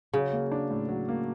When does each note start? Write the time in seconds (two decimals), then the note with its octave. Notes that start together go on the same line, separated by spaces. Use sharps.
0.13 C#3 F#3
0.33 A#3
0.52 D4
0.71 A2
0.89 F#3
1.09 A#3